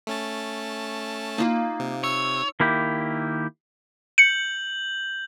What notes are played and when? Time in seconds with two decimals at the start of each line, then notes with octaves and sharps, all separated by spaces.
0.07 A3 C#4 A5
1.38 A#3 D#4 F4
1.80 C3
2.03 C#5 E6
2.60 D#3 A#3 E4 G4
4.18 G6 C#7 F#7